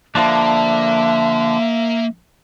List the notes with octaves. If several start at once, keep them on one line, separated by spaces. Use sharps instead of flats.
D3 F3 A#3 D4 E5